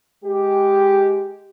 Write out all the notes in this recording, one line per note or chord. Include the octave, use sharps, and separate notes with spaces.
G#3 G4